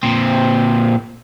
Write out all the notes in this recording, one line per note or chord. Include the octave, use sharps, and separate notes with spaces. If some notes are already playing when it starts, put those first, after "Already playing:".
A#2 C4